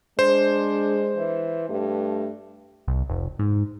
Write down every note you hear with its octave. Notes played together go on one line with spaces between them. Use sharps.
G#3 D4 C5
E3
G2 A3
C2
F1
G#2